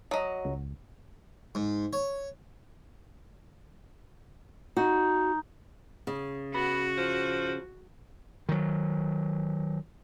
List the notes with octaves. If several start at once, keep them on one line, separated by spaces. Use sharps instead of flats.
F#3 D#5
C#2
G#2
C#5
D#4 F#4
C#3
B3 F#4
F3
D#3 F#3